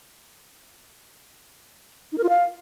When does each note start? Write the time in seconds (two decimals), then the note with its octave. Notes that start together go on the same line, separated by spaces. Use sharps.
2.12 D#4
2.18 A#4
2.24 F4
2.29 F5